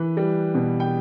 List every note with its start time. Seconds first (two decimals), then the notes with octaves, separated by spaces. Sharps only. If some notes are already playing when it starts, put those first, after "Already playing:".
Already playing: E3 B4
0.17 G3
0.54 B2
0.80 G5